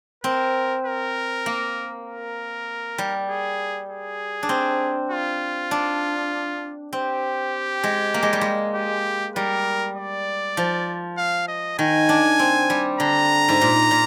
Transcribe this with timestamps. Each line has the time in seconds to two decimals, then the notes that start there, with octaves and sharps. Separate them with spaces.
0.24 C4 A#4
0.85 A#4
1.46 A#3
2.06 A#4
2.98 G3
3.28 G#4
3.89 G#4
4.43 D4
4.49 C4
5.11 F4
5.71 D4
6.93 C4 G4
7.83 G#3
8.14 A#3
8.23 G#3
8.33 G3
8.41 G#3
8.75 G4
9.36 G3 A#4
9.97 D5
10.57 F3
11.18 F5
11.48 D#5
11.79 D#3 G#5
12.09 D4
12.39 C4
12.70 G3
13.00 D3 A#5
13.49 G#2
13.61 A#2
13.91 A#2